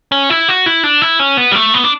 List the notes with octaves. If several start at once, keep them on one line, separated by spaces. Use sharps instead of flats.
C#4
E4
F#4
E4
D4
E4
C#4
B3
G3
A3
B3
D4